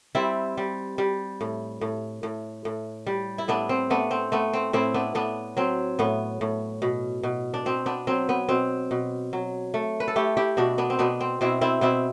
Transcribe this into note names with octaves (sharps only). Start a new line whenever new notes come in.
G3 C4 E4
G3
G3
A2
A2
A2
A2
G3
E4
A2 B3 D4
C4
A3 B3 D4
C4
A3 B3
C4
A2 C4 E4
B3 D4
A2 B3 D4
F#3 C4
A2 B3
A2
B2
B2
D4
B2 C4
B3 D4
F#3 C4
B3
B2 C4
B2
F#3
A3
B4
A4
A3 E4 G4
E4 G4
B2 D4 F#4
B3 D4
C4
B2 B3 D4
C4
B2 C4 E4
C4 E4
B2 C4 E4